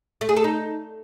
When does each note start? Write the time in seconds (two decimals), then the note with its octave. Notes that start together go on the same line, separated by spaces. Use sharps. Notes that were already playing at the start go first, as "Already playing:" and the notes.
0.21 A3
0.29 G#4
0.36 A4
0.44 D#4